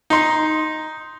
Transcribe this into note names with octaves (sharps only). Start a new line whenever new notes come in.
D#4 C6